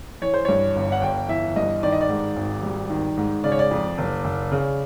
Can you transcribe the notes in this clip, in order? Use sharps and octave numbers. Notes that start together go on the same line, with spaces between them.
E3 C#5
C5
G2 C#5
G1
F#5
G1 G5
E3 E5
G2 D#5
D#3 D5
D#5
D5
G#2
G#1
G3
D#3
G#2
C#3 D5
C#5
D5
F2
F#1
F#1
C#3